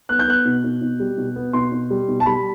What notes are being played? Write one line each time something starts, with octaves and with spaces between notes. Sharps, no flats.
B3 F#6
G6
B3 F#6
B2
B2
B2
G3
B2
B3
B2 C6
B2
G3
B2
A5
G3 B5